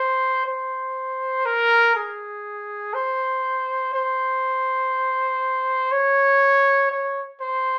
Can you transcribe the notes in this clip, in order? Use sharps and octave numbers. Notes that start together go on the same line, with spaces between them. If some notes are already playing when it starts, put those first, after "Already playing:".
Already playing: C5
C5
A#4
G#4
C5
C5
C#5
C#5
C5